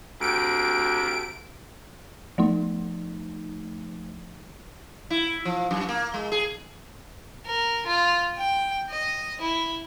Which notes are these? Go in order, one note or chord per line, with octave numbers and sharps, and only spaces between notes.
D2 C3 D7
F3 A3 D#4
E4
F3
F#2
A#3
G#3
G#4
A#4
F4
G5
D#5
E4